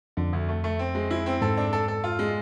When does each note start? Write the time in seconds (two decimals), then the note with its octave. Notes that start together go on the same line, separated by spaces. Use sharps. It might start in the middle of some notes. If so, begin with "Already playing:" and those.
0.17 F2 D3
0.33 D2
0.49 A3
0.64 A3
0.79 C4
0.95 G#3
1.11 E4
1.26 C4
1.42 G#2 A4
1.57 D4
1.73 A4
1.88 A4
2.04 F4
2.19 G#3